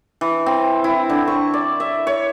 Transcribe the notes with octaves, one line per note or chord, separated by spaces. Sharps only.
E3
C4
E4
D3
C#6
D5
E5
C#5